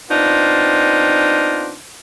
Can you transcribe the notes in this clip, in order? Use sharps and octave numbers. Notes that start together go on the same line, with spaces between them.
B3 C4 D4 D#4 F4